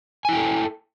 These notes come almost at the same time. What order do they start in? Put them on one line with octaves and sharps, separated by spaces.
G#5 E4 G5 A4